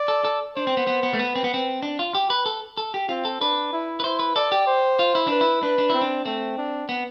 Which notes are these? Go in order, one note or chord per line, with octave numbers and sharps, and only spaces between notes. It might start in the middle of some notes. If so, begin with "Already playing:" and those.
Already playing: D5
A4
A4
D4 C5
C4
B3
B3
B3
A3
B3 B4
C4
B3
C4
D4
F4
G4
B4
A4
A4
G4
C4 F4
A4
D4 B4
E4
B4
E4 C5
B4
A4 D5
G4
C5
F4
E4
D4 B4
E4
D4 B4
D4
C4 E4
D4
A3 C4
D4
B3